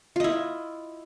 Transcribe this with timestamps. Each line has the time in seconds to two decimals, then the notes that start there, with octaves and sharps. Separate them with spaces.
0.16 F4
0.20 D#5
0.24 E4